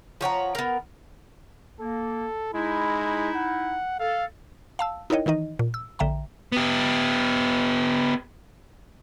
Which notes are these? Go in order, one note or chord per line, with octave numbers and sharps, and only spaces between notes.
F3 C#5 F#5 A#5
B3 A#4
A#3 A4
G#3 D#4 E4
F#5
A4 F5
F5 A5 E6
D#4 E4 A#4 C#5 D#5 G5
D#3 E3 D#4 D#5
A#2
E6
A#1 D3 E5 G5 A#5
B3 G4